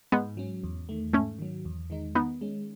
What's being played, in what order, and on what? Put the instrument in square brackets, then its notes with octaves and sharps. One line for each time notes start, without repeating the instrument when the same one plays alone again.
[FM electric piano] G#2 [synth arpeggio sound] G#3 B3
[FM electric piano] F#3 C#4
E2
D#3 A3
[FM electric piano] G#2 [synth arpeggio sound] A3 C#4
[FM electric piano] D#3 F#3
E2
D#3 G#3 D#4
[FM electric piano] D#3 [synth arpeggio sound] B3 D#4
[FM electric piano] G#3 C#4